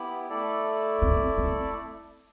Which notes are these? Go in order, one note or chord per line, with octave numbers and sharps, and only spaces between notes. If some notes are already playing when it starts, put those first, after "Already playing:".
Already playing: B3 E4 G4
A3 E4 A4 D5
C4
C4